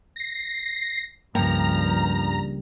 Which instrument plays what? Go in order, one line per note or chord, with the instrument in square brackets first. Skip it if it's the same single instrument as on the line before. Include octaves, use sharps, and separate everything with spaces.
[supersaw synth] A#6 C7
[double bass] C#2 F3 [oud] G2 [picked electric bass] C#3 A#3 [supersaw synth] A#5